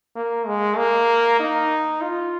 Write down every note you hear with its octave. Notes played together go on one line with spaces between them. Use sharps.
A#3
G#3
A#3
D#4
F4